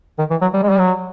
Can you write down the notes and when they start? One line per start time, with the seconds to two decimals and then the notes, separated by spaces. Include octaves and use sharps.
0.19 D#3
0.30 E3
0.41 F#3
0.54 G3
0.63 G#3
0.70 G3
0.79 F#3